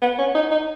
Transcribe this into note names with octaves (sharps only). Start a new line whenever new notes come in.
B3
C#4
D#4
D#4